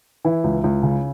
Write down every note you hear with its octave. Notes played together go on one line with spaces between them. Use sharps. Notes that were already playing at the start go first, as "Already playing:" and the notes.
E3 E4
C#2
C#2
C#3